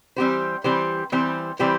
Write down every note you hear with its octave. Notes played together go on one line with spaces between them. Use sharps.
E3 G3 C4 G4 C5
E3 G3 C4 G4 C5
E3 G3 C4 G4 C5
E3 G3 C4 G4 C5